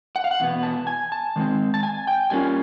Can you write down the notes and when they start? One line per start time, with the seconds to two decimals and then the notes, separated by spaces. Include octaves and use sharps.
0.16 F#5
0.24 F5
0.31 F#5
0.40 E2 B2 B3
0.63 A5
0.87 G#5
1.12 A5
1.36 D#3 G#3 C4
1.74 A5
1.83 G#5
2.07 G5
2.30 B2 G3 A#3 C#4 F4 G#5